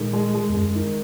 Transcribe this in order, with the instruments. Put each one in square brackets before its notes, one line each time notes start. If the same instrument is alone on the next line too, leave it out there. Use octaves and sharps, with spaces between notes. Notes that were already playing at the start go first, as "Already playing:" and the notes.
Already playing: [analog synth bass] A#2 [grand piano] D#3 G#3
[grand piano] G#3
G#3
[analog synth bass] E2
[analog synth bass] F#2 [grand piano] G#3
[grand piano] D#3